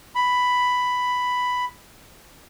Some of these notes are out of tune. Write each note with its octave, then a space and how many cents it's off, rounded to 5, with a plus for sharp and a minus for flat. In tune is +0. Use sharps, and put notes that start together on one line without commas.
B5 +5